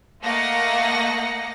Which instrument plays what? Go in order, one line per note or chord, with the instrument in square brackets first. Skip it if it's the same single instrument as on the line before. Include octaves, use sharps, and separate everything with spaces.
[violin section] A3 A#3 D#5 F#5 A#6 C#7